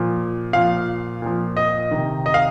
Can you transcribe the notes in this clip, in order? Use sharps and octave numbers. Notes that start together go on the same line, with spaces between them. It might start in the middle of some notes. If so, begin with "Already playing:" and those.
Already playing: A#2 F3
A#2 F3 F5
A#2 F3
D#5
C3 D#3
D#5
F5